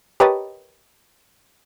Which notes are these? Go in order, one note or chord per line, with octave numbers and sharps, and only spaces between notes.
G4 A#4 B4 C#5 D#5 A5